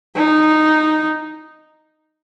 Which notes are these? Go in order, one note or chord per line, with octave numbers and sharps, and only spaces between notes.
D#4